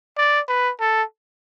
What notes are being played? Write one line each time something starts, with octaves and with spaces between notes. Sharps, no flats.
D5
B4
A4